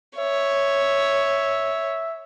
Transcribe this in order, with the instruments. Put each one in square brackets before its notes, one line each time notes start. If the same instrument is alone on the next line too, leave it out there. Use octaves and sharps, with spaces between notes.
[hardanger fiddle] C#5 [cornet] E5